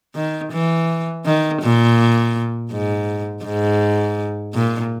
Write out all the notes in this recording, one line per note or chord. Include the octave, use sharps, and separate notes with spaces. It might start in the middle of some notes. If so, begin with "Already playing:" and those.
D#3
E3
D#3
A#2
G#2
G#2
A#2